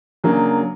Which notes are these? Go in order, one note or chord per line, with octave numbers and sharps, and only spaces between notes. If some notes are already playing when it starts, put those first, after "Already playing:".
C#3 F#3 A#3 D4